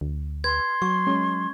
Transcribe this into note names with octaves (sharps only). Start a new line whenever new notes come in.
D2
B4 C6 G#6
F#3 C#6
G#3 C#4